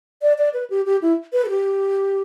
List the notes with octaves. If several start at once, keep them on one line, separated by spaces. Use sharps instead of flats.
D5
D5
B4
G4
G4
E4
B4
A4
G4